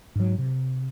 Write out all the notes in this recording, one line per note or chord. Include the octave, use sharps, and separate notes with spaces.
G#2 F#3
C3